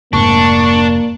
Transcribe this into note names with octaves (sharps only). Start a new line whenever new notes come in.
F1 G#2 A#3 D4 C#6